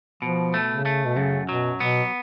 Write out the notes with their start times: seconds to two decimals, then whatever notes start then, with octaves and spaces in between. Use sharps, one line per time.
0.22 B2 F3
0.54 A3
0.70 C#3
0.86 A3
1.06 B2
1.16 F#2 C#3
1.49 B2 F#3
1.80 B2 B3